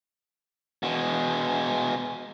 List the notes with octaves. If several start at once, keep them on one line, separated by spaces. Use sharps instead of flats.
B2 G#3